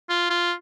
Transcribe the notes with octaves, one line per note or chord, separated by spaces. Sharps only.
F4
F4